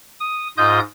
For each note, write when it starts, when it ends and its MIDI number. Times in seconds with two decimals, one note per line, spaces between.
0.20 0.48 87
0.57 0.80 44
0.57 0.80 65
0.57 0.80 75
0.57 0.80 87
0.57 0.80 91